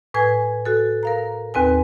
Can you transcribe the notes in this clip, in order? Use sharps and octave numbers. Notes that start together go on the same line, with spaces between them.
A2 B4 G#5 G#6
F#4 A4
A#4 F5 A#5
D#2 C4 B4 G#5